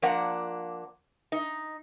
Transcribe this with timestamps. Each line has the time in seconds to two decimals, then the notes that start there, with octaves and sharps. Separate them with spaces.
0.02 F3 A#3 D4 F#5
1.32 D#4